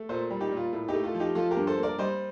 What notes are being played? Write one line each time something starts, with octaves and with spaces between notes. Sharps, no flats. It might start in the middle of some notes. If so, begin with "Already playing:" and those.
Already playing: A3
A#2 A4 C5
G3
D#4 G4
A#2 F4
A2
A3 D#4 G4
F4 A4
F3
D#4 G4
F3 F4 A4
G4 A#4
G2
A4 C5
A#3
A#4 D5
G3 C5 D#5